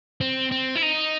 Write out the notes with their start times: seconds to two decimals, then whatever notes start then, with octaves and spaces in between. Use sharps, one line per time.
0.21 C4
0.51 C4
0.75 E4
0.82 D#4